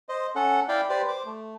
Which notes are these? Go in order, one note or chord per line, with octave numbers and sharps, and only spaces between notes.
C5 D#5
C#4 A4 F#5
E4 D5 F5 G5
G4 B4 C5 D5
C5 D6
A3